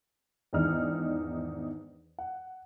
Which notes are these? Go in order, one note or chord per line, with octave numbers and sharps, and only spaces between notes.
E2 G#2 D#3 D4 D#4 F6
F#5